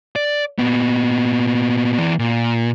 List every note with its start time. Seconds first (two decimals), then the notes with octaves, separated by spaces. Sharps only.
0.16 D5
0.58 A#2 B3
1.98 E3 D5
2.19 A#2